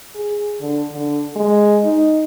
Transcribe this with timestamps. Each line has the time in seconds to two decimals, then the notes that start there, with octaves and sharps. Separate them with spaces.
0.15 G#4
0.61 D3
0.91 D3
1.36 G#3
1.85 D#4